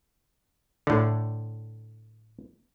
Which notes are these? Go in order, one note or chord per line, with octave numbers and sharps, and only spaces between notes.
A2 D3